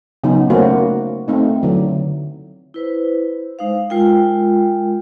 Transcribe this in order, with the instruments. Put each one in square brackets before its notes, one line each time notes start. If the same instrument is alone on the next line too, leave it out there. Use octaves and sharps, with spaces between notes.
[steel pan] C#3 F#3 B3 D#4
A3 A#3 C#4 F#4 C5
A3 C4 D#4
D3 F#3 E4
[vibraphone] E4 B4 C5
G#3 D#4 C5 F5
G#3 F4 A#4 G5